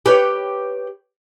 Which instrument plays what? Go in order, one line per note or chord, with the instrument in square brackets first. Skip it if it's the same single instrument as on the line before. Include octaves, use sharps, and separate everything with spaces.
[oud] G4 B4 C#5